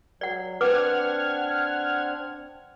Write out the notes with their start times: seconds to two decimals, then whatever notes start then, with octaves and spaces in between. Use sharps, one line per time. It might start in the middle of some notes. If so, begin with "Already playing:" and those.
0.21 F#3 D5 F#5
0.61 C4 D4 B4 F#5 D6 F6 G#6